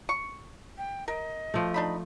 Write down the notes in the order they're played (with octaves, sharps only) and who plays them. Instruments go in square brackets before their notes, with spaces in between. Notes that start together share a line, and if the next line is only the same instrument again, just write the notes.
[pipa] C#6
[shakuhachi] G5
[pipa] A#4 [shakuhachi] D#5
[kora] F3 A3
[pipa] D4 D#4 B5